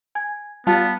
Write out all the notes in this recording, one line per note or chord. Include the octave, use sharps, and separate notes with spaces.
G#5 G#6
G3 B3 F4 A5